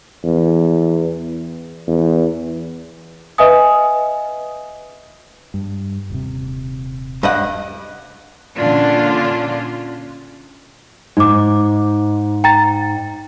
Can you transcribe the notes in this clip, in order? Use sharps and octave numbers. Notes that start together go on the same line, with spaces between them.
E2
E2
B4 D#5 E5 G#5 D#6
G2
D#1 C3
G2 D#5 F#5
A#2 D3 C#4 D4 F4
G#2 D#4 D6
G5 A#5 A6